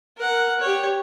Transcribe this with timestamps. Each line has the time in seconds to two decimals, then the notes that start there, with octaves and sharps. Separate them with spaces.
0.17 A#4 F#5
0.60 G4 C#5